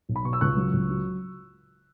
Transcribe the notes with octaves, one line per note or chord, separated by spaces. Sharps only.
B1
B5
B2 C#6
E6
C#2 C#6 F#6
F#3
C#2
F#3